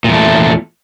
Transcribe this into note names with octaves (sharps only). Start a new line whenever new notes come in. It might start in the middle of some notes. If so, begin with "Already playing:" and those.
E2 A#2 A3